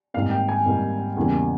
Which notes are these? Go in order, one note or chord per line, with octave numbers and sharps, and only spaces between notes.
G#1 G#2 G3 A#3 F5
G5
G#5
G#1 G#2 G3 A#3
E2 C#3 G3 A#3